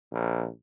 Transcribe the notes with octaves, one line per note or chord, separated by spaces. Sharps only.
A#1